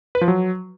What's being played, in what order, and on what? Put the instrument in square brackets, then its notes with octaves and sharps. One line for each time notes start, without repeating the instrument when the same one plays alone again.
[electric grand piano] B4
F3
F#3